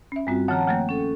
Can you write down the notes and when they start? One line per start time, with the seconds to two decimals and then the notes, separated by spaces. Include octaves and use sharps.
0.12 C#4 E5
0.27 G2 G3 C4 F4 F#4
0.48 D#3 F3 C#5 F#5 A5 A#5
0.67 F3 A3 A#3 F#5 G5
0.89 C#4 A4